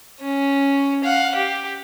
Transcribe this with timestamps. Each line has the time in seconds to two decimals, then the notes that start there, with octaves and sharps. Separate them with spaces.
0.21 C#4
1.04 F5 F#5
1.35 G4